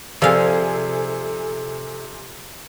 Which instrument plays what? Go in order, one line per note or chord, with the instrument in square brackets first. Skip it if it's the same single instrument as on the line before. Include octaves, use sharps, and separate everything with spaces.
[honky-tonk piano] C3 G#4 [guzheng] F3 F5 [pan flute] A4 [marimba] D5 E6